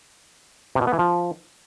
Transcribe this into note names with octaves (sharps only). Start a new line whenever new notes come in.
C3
B2
B3
E3
F3